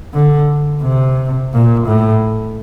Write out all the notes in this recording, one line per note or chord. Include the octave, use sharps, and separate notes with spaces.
D3
C3
A#2
A2